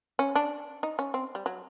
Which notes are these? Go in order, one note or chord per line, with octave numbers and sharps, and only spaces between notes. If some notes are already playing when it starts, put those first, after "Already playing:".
C#4
D4
D#4
C#4
C4
G3
F#3